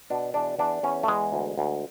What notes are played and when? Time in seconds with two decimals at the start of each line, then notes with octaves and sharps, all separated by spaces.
0.10 B2 D4
0.34 E2 D4
0.59 E2 D4
0.83 E2 C#4
1.03 A3
1.08 E2 G#3
1.32 D2
1.58 D2